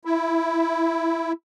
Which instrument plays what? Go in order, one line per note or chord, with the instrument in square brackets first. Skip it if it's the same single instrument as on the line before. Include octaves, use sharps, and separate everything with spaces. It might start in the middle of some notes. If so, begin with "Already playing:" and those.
[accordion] E4